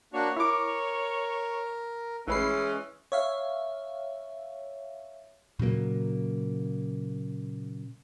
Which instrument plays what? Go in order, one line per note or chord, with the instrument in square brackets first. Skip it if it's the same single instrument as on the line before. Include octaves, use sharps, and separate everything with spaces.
[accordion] A#3 D4 F#4 [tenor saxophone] C#5
[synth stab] E4 D6 [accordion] A#4
[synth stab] A1 B4 C7 [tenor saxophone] E3 [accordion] G#3 C#4
[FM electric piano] C#5 E5 F5
[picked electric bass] A#2 C#3 F#3 A#3